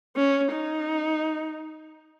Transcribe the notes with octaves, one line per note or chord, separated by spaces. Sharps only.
C#4
D#4